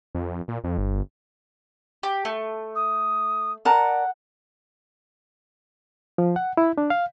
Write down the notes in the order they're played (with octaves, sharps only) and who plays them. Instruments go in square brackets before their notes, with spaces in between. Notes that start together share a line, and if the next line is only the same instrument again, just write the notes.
[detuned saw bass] F2
A#2
F2
G1
[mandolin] G4
A3
[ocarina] D#6
[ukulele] A#4 A5 A#5 [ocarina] D5 [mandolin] F#5
[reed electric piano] F3
F#5
E4
D4
F5